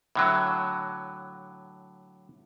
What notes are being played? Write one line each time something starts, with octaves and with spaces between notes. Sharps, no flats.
A2 D3 F#3